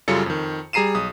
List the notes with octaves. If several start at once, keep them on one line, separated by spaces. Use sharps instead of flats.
F#2 C#3 G3 F4 A4 C#7
F2 D#3
G3 G#4 A#5 C7 D#7 E7
B1 D#6